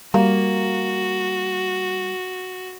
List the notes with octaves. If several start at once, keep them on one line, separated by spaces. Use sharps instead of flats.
G3 A#3 F#4